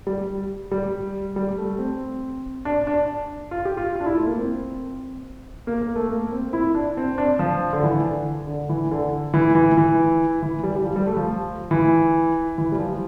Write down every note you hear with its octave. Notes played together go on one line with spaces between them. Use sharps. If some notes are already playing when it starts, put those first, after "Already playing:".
G3
G3
G3
A3
C4
D4
D4
F4
G4
F4
F4
D4
E4
A3
A#3
C4
A#3
A#3
A3
A#3
C4
E4
D4
C4
D4
F3
D3
E3
D3
D3
E3
D3
E3
E3
E3
E3
G3
G3
F3
G3
A3
F3
E3
E3
G3
F3